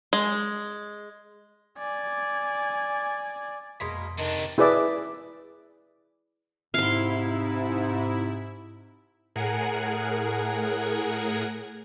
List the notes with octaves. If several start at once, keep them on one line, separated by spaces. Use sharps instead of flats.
G#3
D5 G#5
F2 B2 G#3 A#3 C6 B6
C3 D#3 A3 D4
E4 G#4 B4 D5 E5
G#2 C3 E4 F5 C6
A2 G#4 A#4 F#5 G#6